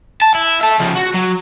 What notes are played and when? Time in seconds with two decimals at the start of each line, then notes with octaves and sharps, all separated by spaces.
0.22 A5
0.35 E4
0.61 E5 A5
0.80 C#3 F3
0.95 F#4
1.14 F#3